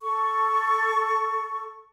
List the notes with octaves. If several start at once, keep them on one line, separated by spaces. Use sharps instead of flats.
A4 C#6